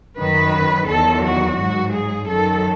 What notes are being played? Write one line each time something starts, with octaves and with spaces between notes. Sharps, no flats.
F#2 D#3 F#3 B4
E2 D#3 F#3 A4
F#4
G#2 F#3 F#4
G#4
F#2 D#3 F#3 A4